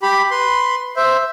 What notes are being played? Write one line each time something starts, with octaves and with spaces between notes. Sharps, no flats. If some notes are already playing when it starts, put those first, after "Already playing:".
G4 B5
B4 C6
C5 E5